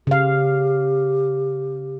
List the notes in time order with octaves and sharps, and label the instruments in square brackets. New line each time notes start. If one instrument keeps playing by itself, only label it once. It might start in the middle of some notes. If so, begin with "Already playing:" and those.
[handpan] C#3 F5 [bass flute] G4